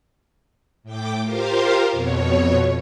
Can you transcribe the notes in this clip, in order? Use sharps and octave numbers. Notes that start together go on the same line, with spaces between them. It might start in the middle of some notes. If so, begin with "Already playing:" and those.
A2 G5 D6
F4 G4 A#4 C5 F5
F2 B2 C#5